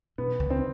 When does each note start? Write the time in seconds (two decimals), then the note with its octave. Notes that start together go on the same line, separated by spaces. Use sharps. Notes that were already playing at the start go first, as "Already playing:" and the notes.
0.18 B2 B3
0.39 C#2
0.50 C4